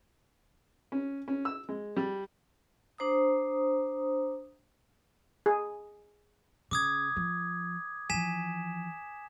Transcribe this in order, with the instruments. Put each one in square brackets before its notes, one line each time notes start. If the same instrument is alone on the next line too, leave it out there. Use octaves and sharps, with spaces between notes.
[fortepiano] C#4
C#4
E6
G#3
G3
[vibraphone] D4 C5 A#5 D#6
[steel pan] G#4
[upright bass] C#3 [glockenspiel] D6 D#6 G#6
[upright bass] F3
[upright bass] E3 F3 [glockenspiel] G#5 B6 E7